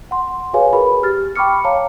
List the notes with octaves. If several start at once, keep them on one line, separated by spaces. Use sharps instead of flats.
F#5 C6
F#4 G#4 B4 C#5 F5 G#5
F#4 G#4 A#4 B4 B5
G4 F6 A6
G5 B5 C#6 D6 F6 C#7
C#5 F5 A5 A#5 D6